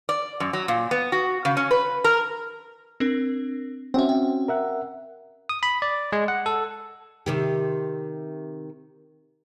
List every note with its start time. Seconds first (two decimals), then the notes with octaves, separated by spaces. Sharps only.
0.09 D5
0.40 F#2
0.53 F#3
0.68 A#2
0.91 B3
1.12 F#4
1.45 C#3
1.57 C#4
1.71 B4
2.04 A#4
3.00 C4 D4 A#4
3.94 C4 C#4 F#4 E5 F#5
4.09 G5
4.48 A#4 E5 F#5
5.49 D#6
5.63 B5
5.82 D5
6.12 G#3
6.28 F#5
6.46 A4
7.26 C3 D#3 G4